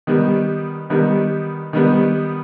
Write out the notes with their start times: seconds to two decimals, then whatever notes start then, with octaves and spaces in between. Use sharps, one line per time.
0.07 D#3 G3 B3
0.90 D#3 G3 B3
1.73 D#3 G3 B3